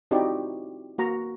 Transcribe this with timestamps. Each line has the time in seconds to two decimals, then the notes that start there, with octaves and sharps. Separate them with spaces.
0.11 C4 D#4 E4 F#4 G4 D5
0.98 A#3 F#4 A#5